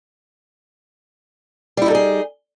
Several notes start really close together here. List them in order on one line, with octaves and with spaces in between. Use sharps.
G3 E4 D#4 A4 G#4